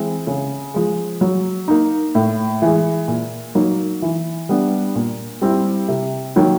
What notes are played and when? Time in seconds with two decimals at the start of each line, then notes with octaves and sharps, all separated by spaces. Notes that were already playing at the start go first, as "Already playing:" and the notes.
Already playing: E3 G#3 C4
0.27 C#3
0.74 F3 G#3
1.21 F#3
1.68 A#3 D#4
2.15 A2
2.62 E3 G#3
3.08 A#2
3.55 F#3 A#3 D#4
4.02 E3
4.49 G3 B3 D4
4.95 A#2
5.42 G3 C4 E4
5.88 C3
6.36 D#3 F#3 A#3